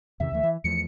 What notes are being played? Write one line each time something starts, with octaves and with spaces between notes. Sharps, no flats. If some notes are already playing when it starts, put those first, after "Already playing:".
E2 C3 D#3 E5
D2 E3 A3
E3
E2 F3 A3 C#7